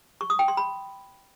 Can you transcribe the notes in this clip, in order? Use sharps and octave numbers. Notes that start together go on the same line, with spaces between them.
C#6
D#6
G5
C6
B5